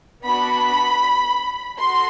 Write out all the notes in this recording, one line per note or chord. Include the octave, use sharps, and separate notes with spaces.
B3 D4 F#4 B5
F#4 A4 C6